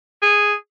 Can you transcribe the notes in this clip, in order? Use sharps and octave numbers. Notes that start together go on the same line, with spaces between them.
G#4